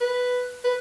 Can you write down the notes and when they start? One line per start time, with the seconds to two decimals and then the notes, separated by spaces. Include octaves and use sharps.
0.01 B4
0.64 B4